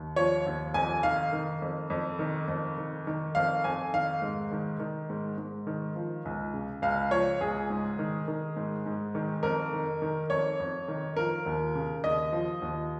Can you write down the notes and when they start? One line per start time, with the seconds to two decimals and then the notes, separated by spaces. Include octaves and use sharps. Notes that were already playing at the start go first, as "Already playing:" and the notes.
Already playing: D#2
0.16 F3 C#5
0.46 D#2
0.74 F2 G#5
1.03 D#3 F5
1.33 D#3
1.62 F2
1.90 F2
2.19 D#3
2.48 F2
2.78 D#3
3.07 D#3
3.35 F2 F5
3.64 F2 G#5
3.94 D#3 F5
4.22 G#2
4.52 D#3
4.80 D#3
5.09 G#2
5.38 G#2
5.67 D#3
5.96 F3
6.25 C#2
6.54 C#3
6.82 C#2 F5
7.11 F3 C#5
7.41 C#2 G#4
7.70 G#2
7.99 D#3
8.28 D#3
8.56 G#2
8.86 G#2
9.15 D#3
9.43 F2 A#4
9.73 D#3
10.02 D#3
10.30 F2 C#5
10.60 F2
10.88 D#3
11.17 F3 A#4
11.46 D#2
11.75 C#3
12.04 D#2 D#5
12.33 F3
12.62 D#2